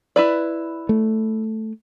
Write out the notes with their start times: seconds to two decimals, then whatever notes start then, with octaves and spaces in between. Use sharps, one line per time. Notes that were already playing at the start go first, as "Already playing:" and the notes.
0.16 E4 B4 D5
0.89 A3